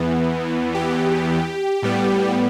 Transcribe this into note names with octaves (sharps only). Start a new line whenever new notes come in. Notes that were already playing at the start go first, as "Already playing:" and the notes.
Already playing: E2 E3 B3
G4
A2 G3 B3